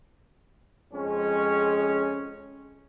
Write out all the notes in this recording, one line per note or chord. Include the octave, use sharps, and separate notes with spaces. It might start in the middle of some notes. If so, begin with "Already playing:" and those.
F2 G#3 C#4